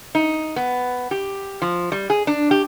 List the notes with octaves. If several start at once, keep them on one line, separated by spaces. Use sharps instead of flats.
D#4
B3
G4
F3
G3
G#4
D4
G4